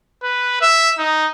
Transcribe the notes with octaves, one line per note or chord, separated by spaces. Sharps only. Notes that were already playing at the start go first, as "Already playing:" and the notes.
B4
E5
D#4